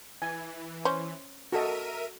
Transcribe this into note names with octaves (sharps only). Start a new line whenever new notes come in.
E3 G#5
C#4 C5
F#4 A4 A#4 D#5 E5 D#7